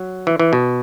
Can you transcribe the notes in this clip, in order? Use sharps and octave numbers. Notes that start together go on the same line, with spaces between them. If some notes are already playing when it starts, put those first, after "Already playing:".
Already playing: F#3
E3
E3
B2